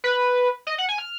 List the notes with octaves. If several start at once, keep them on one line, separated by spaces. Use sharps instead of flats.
B4
D#5
F#5
G#5
F6